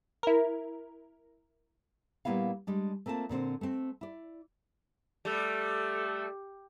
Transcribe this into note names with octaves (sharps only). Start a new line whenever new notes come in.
E4 A#4
A#2 G3 A#3 B3 E4 F5
G3 G#3 D4
A3 A#3 C4 F4 A5
A#2 D3 C4 C5
A3 C4
E4 D5
G3 A3 A4